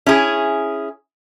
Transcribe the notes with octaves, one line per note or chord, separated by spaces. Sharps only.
C#4 E4 G#4